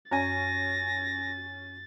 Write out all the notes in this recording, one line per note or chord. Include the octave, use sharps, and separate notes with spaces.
F#2 C#4 G#5 A6 A#6